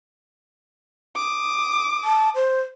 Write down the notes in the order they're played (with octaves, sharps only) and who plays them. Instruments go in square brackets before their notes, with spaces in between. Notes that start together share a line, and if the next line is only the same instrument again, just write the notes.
[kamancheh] D6 D#6
[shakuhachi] A5
C5